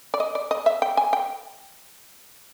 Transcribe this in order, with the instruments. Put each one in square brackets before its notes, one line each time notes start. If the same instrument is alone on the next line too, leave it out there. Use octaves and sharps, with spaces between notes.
[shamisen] D5
D#5
D5
D#5
E5
G5
G#5
G5